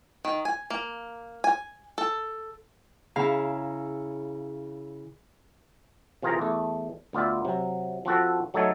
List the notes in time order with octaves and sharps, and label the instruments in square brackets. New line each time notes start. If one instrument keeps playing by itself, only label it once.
[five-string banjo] D#3
G#5
A#3
G#5
A4
[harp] C#3 E4 F5 A#5
[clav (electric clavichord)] C3 E3 F4 G#4 A#4 A#5
E2 A3
D2 B3 F4 D5 E5
C3 F#3
F3 C4 F#4 A4
F#3 A3 D#4 A4 C#5